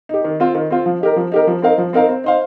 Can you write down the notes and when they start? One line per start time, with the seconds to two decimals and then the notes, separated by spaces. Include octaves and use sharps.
0.09 D#4 G4
0.24 D#3
0.40 C4 F4
0.55 D#3
0.71 C4 F4
0.86 F3
1.01 D#4 G4 A#4
1.16 F3
1.32 D#4 G4 A#4
1.47 F3
1.62 C4 D#4 A#4 F5
1.78 F3
1.93 C4 D#4 A#4 F5
2.09 C4
2.24 D#4 C5 F5